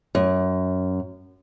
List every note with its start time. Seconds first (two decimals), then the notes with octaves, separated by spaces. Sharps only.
0.15 F#2